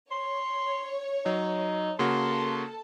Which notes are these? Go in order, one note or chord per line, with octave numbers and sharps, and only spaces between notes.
C#5 C6
F#3 D#4
C#3 A#3 F#4 A4 A5 C6